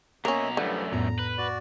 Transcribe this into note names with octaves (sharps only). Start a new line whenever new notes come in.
B2 A#3 C#4 C#5 D#5 E5 A#5
F#2 D3 E3 F3 G3 A3
F2 A2 B3 A#5
B4
F#4 D5